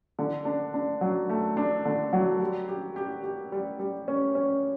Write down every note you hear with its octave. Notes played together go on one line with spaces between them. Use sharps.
D3
D4
D4
F#3
A3
D4
D3
F#3
G3
G4
G4
G4
G3
G3
C#4
C#4